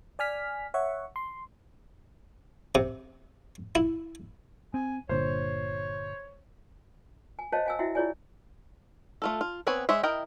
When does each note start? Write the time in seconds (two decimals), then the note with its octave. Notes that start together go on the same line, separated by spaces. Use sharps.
0.19 D5 G#5 F6 B6
0.74 C#5 E5 F#5 C#6
1.16 C6
2.75 C3
3.75 E4
4.74 C4 G#5
5.09 G1 A#2 D3 C5 C#5
7.39 G#5
7.52 C5 C#5 D#5 F5 G5 A5
7.66 F5 G#5 E6
7.79 E4 F#4 E5 G5
7.95 E4 F4 G#4 C#5 D5 G#5
9.22 A3 F4 A4
9.41 F4
9.67 B3 C4 B4 C#5 G#5
9.89 G#3 C5 C#5 E5
10.03 E4 A#4 D#5 G5